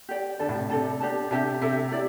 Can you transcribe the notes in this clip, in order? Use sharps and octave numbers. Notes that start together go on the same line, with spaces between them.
G4 D5 G5
D3 A4 D5 A5
A2
C3
C3 A4 D5 A5
D4 G4 D5 A5
C3 D4 G4 E5 A5
C3 A4 E5 G5
E4 G4 D5